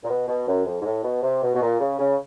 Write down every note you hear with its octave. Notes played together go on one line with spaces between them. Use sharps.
A#2
B2
B2
F#2
F2
G#2
A2
B2
C3
B2
B2
A#2
C#3
C#3